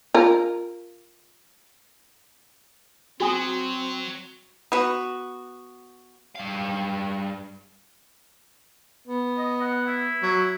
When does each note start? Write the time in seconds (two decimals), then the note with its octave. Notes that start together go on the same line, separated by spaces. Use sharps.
0.14 F4 A#4
3.20 F#3 C4 F#4 G#5 D#6
4.72 B3 F#4
6.36 G2 F5
9.08 B3
9.37 D#5
9.61 F#5
9.87 E4
10.23 F#3